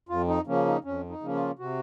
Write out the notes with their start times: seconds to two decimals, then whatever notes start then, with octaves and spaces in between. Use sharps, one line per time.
0.09 F2 F4
0.28 D#4
0.47 C#3 F3 A#3 C#4
0.66 D#4
0.84 F2 C#4
1.09 D#4
1.21 C#3 F3 A#3 C#4
1.34 F4
1.59 C3 F#4